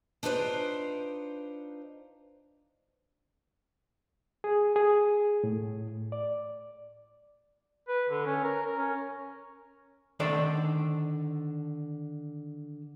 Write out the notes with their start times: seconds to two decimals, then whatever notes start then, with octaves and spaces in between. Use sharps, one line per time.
0.23 D4 D#4 F4 B4 C5 D5
4.44 G#4
4.76 G#4
5.44 A2
6.12 D5
7.88 B4
8.09 D3
8.26 C#4
8.44 A#4
8.65 A#4
8.77 C#4
10.20 D3 D#3 D4 A4 C5 D5